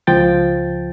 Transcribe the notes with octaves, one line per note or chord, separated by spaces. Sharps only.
C#2 F3 G5 A6